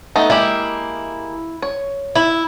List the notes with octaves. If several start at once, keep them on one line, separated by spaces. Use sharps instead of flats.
A3 B3 D#4
G#3 A#3 E4 G4
C#5
E4